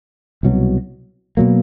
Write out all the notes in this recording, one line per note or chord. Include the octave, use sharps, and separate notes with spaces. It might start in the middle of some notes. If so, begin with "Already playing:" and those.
C2 B2 F#3
B2 F#3 A#3